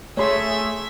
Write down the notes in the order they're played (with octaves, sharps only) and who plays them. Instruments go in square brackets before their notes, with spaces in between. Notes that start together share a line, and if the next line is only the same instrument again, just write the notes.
[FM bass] A3 [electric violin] G#4 [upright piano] C#5 C6 [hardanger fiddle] E5